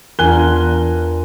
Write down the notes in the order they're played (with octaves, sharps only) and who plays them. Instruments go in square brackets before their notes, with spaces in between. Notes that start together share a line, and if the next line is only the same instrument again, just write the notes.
[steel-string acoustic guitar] E2 [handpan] D4 F4 A#4 [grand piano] G#5 F#6 G7